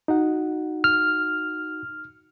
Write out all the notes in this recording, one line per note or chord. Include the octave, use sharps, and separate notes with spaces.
D#4 F#4 F#5
F6